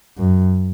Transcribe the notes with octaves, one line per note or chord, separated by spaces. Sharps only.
F#2